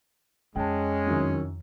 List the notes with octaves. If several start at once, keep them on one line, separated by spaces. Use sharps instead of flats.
F2 G#3 C#4 G5 A5
C2 F#2 D#3